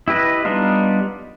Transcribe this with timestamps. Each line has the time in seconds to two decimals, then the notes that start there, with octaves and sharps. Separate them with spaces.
0.08 E4 G4 B4 D#5
0.45 G3 B3 D4 D#4 F4